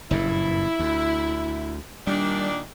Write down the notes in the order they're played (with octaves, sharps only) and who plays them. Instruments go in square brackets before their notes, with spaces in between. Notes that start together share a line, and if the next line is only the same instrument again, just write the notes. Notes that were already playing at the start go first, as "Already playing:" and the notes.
[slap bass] F#1 G2 A#2 [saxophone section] E4
[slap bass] D2
[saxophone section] A#2 D#3 D4 [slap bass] G3